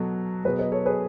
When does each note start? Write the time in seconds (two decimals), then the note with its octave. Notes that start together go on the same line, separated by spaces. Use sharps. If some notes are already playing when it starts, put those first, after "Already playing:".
Already playing: B2 F#3 F#4 A4
0.45 B2 F#3 G#4 B4
0.59 B4 D#5
0.72 A4 C#5
0.86 G#4 B4